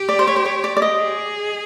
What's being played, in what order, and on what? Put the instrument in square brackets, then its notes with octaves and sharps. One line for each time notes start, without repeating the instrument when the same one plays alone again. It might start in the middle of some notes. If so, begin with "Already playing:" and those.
Already playing: [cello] G4
[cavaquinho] D5
C5
C#5
C5
C#5
D5
D5
D#5
[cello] G#4